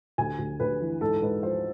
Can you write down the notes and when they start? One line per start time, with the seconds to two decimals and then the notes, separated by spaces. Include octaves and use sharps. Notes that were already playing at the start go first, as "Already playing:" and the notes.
0.18 D2 G#5
0.39 D2
0.60 D2 B4
0.81 E3
1.01 G#2 A4
1.22 G#2 B4
1.43 F3 C5